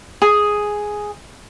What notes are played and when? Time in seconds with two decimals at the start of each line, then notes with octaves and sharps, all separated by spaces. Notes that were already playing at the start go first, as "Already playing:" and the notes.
0.22 G#4